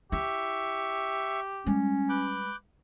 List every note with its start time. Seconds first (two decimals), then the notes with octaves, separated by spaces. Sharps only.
0.12 E4 G4 E5 C#6
1.67 G3 G#3 C#4
2.09 B4 D6 F#6 G6